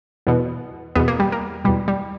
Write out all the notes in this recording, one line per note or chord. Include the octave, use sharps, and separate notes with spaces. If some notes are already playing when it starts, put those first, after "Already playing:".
E2 B2
E2 B2 B3
A#3
G3
A#3
E2 B2 G3
G3